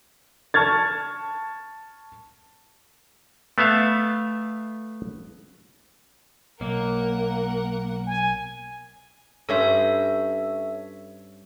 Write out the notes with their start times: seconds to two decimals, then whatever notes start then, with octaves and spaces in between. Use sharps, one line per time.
0.54 A5 C#6 F6 G#6 A6
3.58 A3 B3 E5 F5
6.61 B1 A#3 A#4 F#5
8.07 G#5
9.49 G2 C#4 A4 C5 C#5 E5